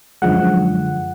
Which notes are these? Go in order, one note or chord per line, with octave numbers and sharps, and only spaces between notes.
F#2 D3 F3 G#3 F#5